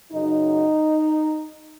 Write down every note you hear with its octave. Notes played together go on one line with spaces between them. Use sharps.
F#2 C#3 F#3 D#4